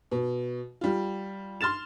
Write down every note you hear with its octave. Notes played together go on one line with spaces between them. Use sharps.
B2
G3 F4
C6 F6 A6 E7